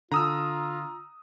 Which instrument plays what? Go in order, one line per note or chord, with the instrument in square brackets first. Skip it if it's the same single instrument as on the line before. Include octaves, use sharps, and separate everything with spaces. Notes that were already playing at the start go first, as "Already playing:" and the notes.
[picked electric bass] D3 [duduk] F4 [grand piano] A#5 D#6 E6